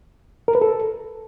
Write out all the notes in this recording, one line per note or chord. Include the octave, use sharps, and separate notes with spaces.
A#4
B4
A4